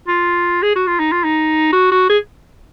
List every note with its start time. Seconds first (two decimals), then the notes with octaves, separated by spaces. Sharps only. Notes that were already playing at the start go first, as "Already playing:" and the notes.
0.08 F4
0.63 G#4
0.76 F#4
0.87 F4
1.00 D#4
1.12 F4
1.24 D#4
1.73 F#4
1.92 F#4
2.10 G#4